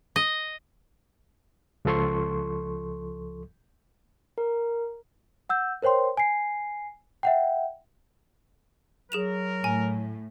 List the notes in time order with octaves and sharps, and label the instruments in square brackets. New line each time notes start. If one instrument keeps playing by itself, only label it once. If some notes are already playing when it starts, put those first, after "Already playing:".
[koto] D#5
[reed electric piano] C#2 F3 A4 C6 C#6
[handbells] A#4
[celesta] F#5 E6 G6
A#4 C5 C#5 G5 C6
G#5 C7
E5 F#5 G5
[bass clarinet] F#3 [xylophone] G#4 E7 F7 [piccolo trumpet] A#4
[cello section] A2 [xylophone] G#5